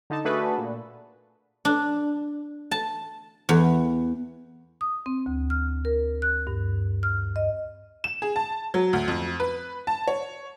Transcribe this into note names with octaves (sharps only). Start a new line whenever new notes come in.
D3 D#4 A5
A3 D4 F#4 G#4 A4 B4
A#2
D4
A5
E2
D#6
C4
D2
F6
A#4
F#6
G2
F6
D#5
E7
G#4
A5
F#3
D2
F2
B4
A5
C#5